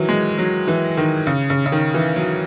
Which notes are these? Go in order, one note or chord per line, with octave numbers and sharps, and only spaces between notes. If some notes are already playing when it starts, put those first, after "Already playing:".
Already playing: D#3 E3 F#3
G#3
F#3
E3
D#3
C#3
C#3
C#3
D#3
E3
F#3